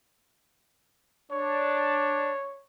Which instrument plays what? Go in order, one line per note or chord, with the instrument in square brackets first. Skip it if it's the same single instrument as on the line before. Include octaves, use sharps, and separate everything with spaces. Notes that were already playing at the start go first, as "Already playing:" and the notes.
[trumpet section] D4 [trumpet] C#5